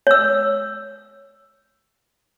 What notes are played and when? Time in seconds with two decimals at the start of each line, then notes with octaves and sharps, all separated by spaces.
0.07 C#5 E6